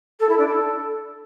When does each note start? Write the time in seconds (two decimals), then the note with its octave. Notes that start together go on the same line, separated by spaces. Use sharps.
0.20 A4
0.29 E4
0.38 D4
0.47 A4